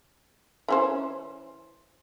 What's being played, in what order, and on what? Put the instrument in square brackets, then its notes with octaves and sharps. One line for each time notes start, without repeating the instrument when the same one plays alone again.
[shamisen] E3 C#4 C5